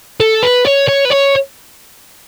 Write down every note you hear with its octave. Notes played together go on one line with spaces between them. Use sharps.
A4
B4
C#5
C#5
B4
C#5